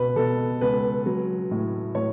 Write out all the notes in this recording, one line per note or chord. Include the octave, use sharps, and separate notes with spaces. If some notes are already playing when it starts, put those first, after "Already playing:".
Already playing: C#2 B2 B4
B2 A4
C#2 B4
F#3
A2
A2 C#5